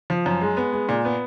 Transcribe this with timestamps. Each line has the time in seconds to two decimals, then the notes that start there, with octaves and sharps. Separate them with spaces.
0.10 F3
0.26 F#2
0.42 G#3
0.57 B3
0.73 G#3
0.89 A#2
1.05 B3